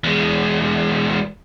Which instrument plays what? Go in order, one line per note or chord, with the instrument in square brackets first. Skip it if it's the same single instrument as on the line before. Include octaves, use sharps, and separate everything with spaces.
[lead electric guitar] E2 G#3